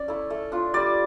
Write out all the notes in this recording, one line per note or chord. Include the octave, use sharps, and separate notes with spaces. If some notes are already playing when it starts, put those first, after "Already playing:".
Already playing: C#4 D5
A3 E4
A3
D4 F4
G3 D5